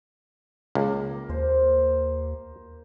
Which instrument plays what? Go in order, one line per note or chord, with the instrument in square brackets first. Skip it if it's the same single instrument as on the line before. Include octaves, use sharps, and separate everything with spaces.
[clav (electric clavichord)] C#2 [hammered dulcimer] A#3
[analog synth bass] D#2 [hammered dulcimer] C5